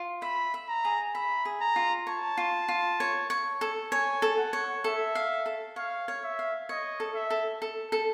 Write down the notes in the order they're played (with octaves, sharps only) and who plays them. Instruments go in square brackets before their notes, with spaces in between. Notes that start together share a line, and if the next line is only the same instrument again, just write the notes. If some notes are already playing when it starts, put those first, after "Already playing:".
Already playing: [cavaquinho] F4
[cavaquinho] E5 [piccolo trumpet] B5
[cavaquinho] E5
[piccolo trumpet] A#5
[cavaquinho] G#4
[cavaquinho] E5 [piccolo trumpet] B5
[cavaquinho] G#4
[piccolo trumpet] A#5
[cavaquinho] F4
[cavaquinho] C#5 [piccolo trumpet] A5
[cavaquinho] F4
F4
C#5
C#5
A4
[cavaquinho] C#5 [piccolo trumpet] G#5
[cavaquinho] A4
[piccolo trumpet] F#5
[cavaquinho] C#5
[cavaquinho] A4 [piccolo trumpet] E5
[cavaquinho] F5
A4
[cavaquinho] C#5 [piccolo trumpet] F5
[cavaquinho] C#5
[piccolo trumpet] E5
[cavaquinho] F5
[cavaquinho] C#5 [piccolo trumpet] D#5
[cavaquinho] A4
[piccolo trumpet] E5
[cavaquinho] A4
A4
A4